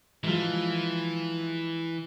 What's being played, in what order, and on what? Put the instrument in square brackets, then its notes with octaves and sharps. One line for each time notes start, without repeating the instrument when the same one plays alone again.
[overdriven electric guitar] E3 [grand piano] F3 G#3